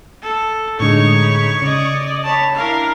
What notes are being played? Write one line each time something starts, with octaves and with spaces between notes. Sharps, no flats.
A4
A2 D3 G#3 D#4 C#5 C#6
D#4 B5
C#3 D5 D#5
C#5 A5 B5
D4 E4 A#4 F5